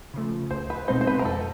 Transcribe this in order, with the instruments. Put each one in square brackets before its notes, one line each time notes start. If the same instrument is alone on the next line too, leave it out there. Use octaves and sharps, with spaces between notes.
[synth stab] C#3 F3 A3
[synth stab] C#2 [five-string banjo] C5
[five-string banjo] B4
[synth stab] B2 G#3 C4 D#4 [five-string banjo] C5
[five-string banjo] C5
B4
A#4
[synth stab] F2 [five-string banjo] A4